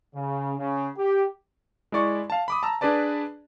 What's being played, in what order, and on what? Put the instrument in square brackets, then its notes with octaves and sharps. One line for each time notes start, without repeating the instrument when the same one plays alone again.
[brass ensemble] C#3
C#3
G4
[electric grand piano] G#3 E4 D5 C#6
F5 A5
B5 D6 D#6
A5 A#5 E6
D4 G#4 B4 D5 A5